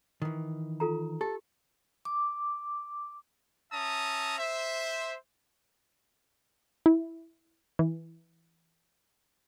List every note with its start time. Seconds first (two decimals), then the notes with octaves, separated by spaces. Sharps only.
0.22 D#3 E3
0.80 F4 A4 A#5
1.21 G4 A4
2.05 D6
3.72 C#4 E5 A5 A#5 D#6
4.38 C5 E5
6.86 E4
7.79 E3